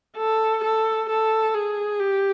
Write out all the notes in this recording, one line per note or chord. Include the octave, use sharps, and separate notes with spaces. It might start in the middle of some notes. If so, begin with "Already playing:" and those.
A4
A4
A4
G#4
G4